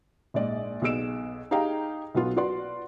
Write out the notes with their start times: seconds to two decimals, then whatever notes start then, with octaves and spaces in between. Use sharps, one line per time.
0.34 A#1 G#2 D5 D#5
0.82 B1 B2 G#4 E6 D7 E7
1.51 D#4 G4 G#4 F5 G5 A#5
2.14 B1 F#3 B3 F4
2.36 F4 F#4 B4 D5 C6